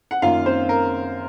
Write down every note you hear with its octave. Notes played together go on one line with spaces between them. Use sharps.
F#5
F#2 D#3 A#3 F4 F5
C4 C5
A#4